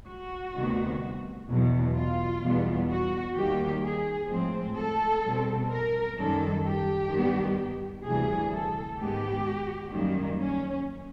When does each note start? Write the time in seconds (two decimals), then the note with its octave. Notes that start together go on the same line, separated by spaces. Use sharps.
0.08 F#4
0.55 D2 C3 D#3 G3 B3
1.50 E2 B2 F#3
1.95 F4
2.42 E2 B2 G3 B3
2.89 F#4
3.36 D#2 D#3 G3 A#3 G4
3.83 G#4
4.30 A2 F3 G#3 C4
4.77 A4
5.24 B2 G3 C4
5.71 A#4
6.18 F#2 D#3 G3 A4
6.64 G4
7.11 G2 D#3 G3 B3
8.05 D2 C3 E3 G3 G#4
8.52 A4
8.98 G#2 D#3 G#3 B3 G4
9.93 F#2 D#3 G3 A#3
10.40 C#4